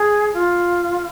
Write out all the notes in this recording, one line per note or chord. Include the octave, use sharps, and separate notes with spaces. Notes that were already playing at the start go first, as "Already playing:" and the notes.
Already playing: G#4
F4